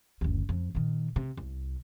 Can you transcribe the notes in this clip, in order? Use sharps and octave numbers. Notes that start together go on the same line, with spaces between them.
F#1 D2
F2
A#2 D#3
C3
C2